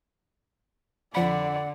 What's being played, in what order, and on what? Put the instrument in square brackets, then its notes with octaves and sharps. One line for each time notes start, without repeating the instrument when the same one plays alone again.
[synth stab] F2 F3 B5 [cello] D3 [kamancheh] D5 [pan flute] F#5